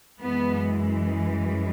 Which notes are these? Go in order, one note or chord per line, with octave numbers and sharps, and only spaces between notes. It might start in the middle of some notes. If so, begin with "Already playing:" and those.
F#2 E3 G#3 B3